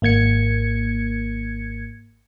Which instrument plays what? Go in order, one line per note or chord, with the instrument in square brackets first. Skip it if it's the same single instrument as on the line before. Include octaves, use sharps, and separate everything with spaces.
[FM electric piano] G#1 A#3 G#6 C#7